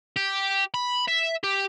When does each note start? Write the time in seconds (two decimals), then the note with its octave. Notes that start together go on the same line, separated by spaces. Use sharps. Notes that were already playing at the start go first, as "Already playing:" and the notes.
0.16 G4
0.74 B5
1.08 E5
1.44 G4